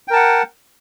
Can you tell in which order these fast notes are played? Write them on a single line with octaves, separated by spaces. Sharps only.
G5 A#4 A5 F#5